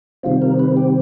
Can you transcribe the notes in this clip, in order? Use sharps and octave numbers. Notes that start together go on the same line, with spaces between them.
C3 D#3 G3 C4 F4
A#4
B4
G4